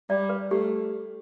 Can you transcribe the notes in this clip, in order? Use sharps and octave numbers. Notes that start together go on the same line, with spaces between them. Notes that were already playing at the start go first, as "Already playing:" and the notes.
G3 D5
B4
A3 G4